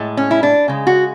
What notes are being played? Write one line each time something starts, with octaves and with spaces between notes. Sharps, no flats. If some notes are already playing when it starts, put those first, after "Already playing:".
Already playing: A2 G#3
C#4
E4
D4
C#3 G#3
F#4